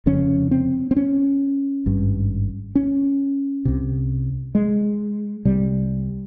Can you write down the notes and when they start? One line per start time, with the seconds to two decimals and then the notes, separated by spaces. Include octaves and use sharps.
0.06 F1 F2 C#3 C#4
0.51 C4
0.91 C4
0.96 C#4
1.86 G#1 G2
2.75 C#4
3.65 C2 C3
4.55 G#3
5.45 C2 C3 G3